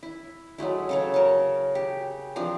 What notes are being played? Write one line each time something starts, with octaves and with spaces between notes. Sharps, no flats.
E4
F#3 G#3 A3 E4
C#3 A4 C#5
A#4 A5
G4
C3 E3 F3 D4